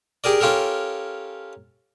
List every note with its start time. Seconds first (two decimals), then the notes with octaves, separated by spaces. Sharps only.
0.24 G4 G#4 A#4 D5
0.41 C#4 F4 G4 A4 A#4